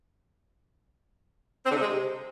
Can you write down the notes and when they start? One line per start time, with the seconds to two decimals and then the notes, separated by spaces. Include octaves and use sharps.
1.64 C4
1.70 D3
1.75 C3
1.81 G#3
1.86 C3